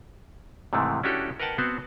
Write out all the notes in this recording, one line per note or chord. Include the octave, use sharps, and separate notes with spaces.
G#2 C3 D#3 E3 A3
C#4 D4 E4 F#4 G4 A4
A#4 B4 D#5 F#5 G5 A5
B3 C4 F#4 C5